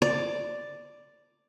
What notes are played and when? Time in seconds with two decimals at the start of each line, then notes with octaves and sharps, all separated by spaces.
0.02 D5